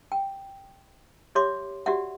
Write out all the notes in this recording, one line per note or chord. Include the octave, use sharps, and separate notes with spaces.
G5
G4 C#5 E5 C6 D6
F#4 G4 D5 E5 F#5